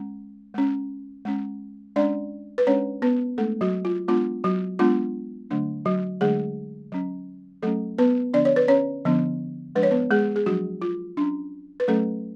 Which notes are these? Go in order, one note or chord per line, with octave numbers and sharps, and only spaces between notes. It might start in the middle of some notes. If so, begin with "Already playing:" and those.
Already playing: G#3 C#4
G#3 C#4
G#3 C#4
G#3 C#4 D4 D5
B4
G#3 C#4 D4 C#5
B3 B4
G#3 A3 D4 A4
F#3 F#4
F4
G#3 B3 D4 F4
F#3 F#4
G#3 B3 D4 F4
D3 F#3 A3 D4
F#3 F#4
D3 F#3 G#3 A3 D4 G#4
F#3 C#4
F#3 A3 C#4 A4
B3 B4
D3 F3 B3 D4 D5
C#5
B4
C#4 C#5
D3 F3 B3 D4
F3 G#3 D4 B4
C#5
B3 B4
G#3 G#4
G#4
F3 F#3 G#3 D4 F#4
F4
F#3 C#4 D4
B4
F#3 A3 C#4 A4